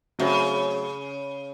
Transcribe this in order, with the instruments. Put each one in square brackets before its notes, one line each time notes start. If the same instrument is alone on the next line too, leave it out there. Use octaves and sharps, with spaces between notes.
[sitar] C#3 [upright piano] F#3 A3 C4 F#4